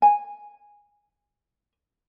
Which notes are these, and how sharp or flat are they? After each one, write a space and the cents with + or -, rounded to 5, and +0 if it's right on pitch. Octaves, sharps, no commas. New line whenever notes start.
G#5 -10